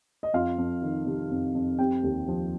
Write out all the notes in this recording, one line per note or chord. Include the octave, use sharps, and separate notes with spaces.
D#5
F2 F4 F5
F2
D#3
C3
F2
F2
C4 G4 G5
D#2
F3